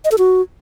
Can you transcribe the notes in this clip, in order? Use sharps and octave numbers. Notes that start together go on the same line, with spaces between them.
D#5
A4
F#4